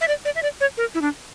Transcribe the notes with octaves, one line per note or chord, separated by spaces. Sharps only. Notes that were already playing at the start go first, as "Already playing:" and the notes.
E5
D5
D5
E5
D5
C#5
A#4
E4
D4